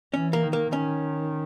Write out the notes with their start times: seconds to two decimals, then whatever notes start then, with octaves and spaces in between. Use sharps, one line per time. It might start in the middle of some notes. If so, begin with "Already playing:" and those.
0.14 E3 C#4
0.33 A#3
0.42 D#3
0.53 A#3
0.73 D#3 C#4